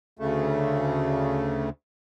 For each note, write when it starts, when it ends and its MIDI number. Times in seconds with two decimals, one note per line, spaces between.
0.19 1.70 38
0.19 1.70 49
0.19 1.70 57